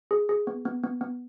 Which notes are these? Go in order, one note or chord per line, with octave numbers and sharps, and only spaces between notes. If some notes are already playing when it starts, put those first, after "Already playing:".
G#4
G#4
B3
B3
B3
B3